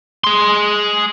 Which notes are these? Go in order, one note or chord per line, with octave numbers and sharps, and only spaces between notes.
G#4 C6